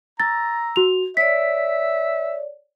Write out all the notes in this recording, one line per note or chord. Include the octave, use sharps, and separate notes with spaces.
A#5 E6 A6
F#4 F7
C#5 D5 E5 B6